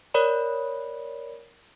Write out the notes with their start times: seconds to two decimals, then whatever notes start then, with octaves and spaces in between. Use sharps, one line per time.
0.14 A#4 C#5 D5 B5